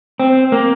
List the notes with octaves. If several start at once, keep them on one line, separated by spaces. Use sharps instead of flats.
C4
A#3